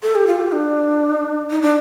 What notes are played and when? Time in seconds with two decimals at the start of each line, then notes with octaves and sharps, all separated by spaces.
0.03 A4
0.15 G4
0.27 F4
0.40 G4
0.52 D4
1.50 D#4
1.62 D4